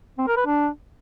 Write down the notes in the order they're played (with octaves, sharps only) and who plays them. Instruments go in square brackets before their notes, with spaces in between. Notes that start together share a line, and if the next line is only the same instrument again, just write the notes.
[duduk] C4
A#4
B4
D4